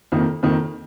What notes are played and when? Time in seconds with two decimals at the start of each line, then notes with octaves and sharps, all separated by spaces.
0.12 F2 D#3 A#3
0.43 F2 D#3 A#3